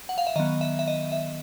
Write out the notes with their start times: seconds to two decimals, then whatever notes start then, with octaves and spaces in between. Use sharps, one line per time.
0.09 F#5
0.18 F5
0.27 E5
0.36 D#3 F#3 B3 D#5
0.61 E5
0.79 E5
0.88 D#5
1.12 E5